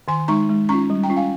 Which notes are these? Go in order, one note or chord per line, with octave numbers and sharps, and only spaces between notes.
D#3 G#5 C6
G#3 D#4 A#5 C#6
G#3
C#4 F4 A#5 C#6
G3
G5 A#5
C#4 F4
F5 G#5